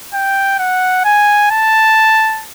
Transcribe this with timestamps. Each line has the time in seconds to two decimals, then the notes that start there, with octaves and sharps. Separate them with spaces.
0.14 G5
0.59 F#5
1.05 G#5
1.51 A5